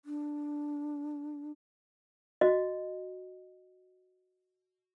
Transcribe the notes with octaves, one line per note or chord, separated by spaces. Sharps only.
D4
F#4 D#5